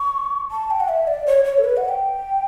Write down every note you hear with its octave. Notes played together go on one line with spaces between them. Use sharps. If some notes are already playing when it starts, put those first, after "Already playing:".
Already playing: C#6
A5
G5
F#5
E5
D5
C#5
C#5
A4
B4
F#5
G5